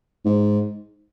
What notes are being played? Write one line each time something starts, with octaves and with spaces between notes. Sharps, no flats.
G#2